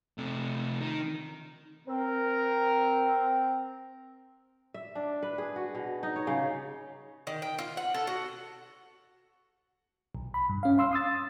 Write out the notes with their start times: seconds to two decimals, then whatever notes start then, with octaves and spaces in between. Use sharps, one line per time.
0.18 C3 A3
0.81 D#3
1.88 C4 A#4
4.74 E5
4.95 D4
5.23 B4
5.38 G#4
5.56 F#4
5.75 B2
6.03 D#4
6.16 C#5
6.27 C#3
7.27 D#3
7.42 G5
7.58 F4
7.77 F#5
7.94 A4
8.07 F#4
10.15 B1
10.34 B5
10.49 G2
10.63 C#4 F5
10.78 F5 C6 E6
10.92 C6 D#6 E6 A6